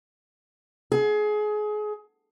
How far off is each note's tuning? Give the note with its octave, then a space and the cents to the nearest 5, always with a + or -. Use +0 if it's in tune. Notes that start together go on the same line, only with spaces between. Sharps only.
G#4 +25